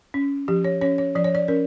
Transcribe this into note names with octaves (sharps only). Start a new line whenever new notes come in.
C#4
F3 G4
C#5
C#4 C#5
C#5
F3 D5
C#5
D5
C#4 A#4